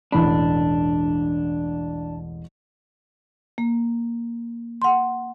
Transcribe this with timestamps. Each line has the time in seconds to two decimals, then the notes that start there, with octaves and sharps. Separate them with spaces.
0.12 E1 A1 D4 B5
3.58 A#3
4.82 F#5 C6